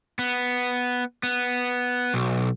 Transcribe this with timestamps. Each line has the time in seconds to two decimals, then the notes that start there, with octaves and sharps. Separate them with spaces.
0.19 B3
1.23 B3
2.14 B1